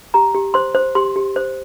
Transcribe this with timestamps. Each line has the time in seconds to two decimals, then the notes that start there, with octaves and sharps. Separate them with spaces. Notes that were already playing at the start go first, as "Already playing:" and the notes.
0.14 G4 A#5
0.35 G4
0.54 C5 C6
0.75 C5
0.95 G4 C6
1.16 G4
1.36 C5